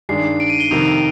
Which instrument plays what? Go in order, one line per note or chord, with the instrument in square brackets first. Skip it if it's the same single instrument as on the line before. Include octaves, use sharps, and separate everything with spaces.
[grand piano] G2 D#3 G#3 D4 [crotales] C7
[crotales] D7
D#7
G7
[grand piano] F2 C3 D#3 A#3 [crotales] F7